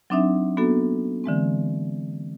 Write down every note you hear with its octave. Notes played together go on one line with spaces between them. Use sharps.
F#3 C4 D4 D#4 E5
A#3 B3 D4 F#4 A4
D3 E3 G#3 C4